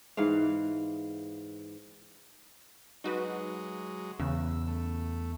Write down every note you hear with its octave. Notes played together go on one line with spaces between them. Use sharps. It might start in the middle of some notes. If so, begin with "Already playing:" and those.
G#2 E3 F5
F#3 G#3 D#4 F#4 B4
E2 C#3 E6
A3